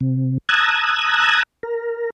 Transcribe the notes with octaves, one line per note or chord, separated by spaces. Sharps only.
C3
A5 A#5 D#6 E6 F#6 G#6
A#4